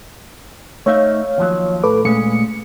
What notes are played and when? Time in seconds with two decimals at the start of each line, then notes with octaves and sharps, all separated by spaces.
0.86 A3 D#4 C#5 E5 F5
1.38 D#2 F3 F#3
1.83 A2 A4 B4 D6
2.05 A#2 G#3 A3 C#4 C#7